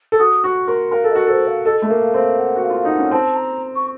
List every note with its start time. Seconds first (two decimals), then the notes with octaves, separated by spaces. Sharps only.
0.12 A4
0.19 F#4 D#6
0.44 F#4 C#6
0.68 A#4 C6
0.92 A#4 F5
1.04 A4
1.11 F#4 D#5
1.27 A4 C5
1.47 F5
1.65 A4 D#5
1.82 A3
1.90 A#3 F5
2.14 C4 F5
2.39 F#5
2.56 F#4
2.63 F5
2.70 F4
2.85 D#4 F#5
2.98 C#4
3.11 C4 A5
3.36 A#5
3.75 C#6